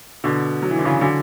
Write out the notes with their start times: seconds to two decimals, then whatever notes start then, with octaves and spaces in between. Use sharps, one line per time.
0.24 B2 D3
0.63 F#3
0.70 E3
0.78 D3
0.85 C#3 E3
1.01 D3 F#3